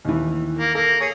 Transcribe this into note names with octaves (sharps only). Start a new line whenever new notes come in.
D#2 E3
A#3
A#3 A4
G#4 C#5